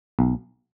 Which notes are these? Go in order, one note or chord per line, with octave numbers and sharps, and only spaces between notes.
B1